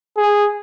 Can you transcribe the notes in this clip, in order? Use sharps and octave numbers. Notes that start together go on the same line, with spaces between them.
G#4